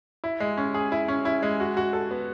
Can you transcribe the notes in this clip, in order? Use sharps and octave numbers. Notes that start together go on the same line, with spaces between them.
E4
G#3
C#4
G#4
E4
C#4
E4
G#3
F#4
F#4
A4
B3